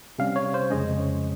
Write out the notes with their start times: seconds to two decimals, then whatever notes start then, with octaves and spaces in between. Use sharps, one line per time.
0.19 C3 G3 C#4 F5
0.36 C#5
0.54 C5
0.70 F2 C#3 G#3 C#4 D#5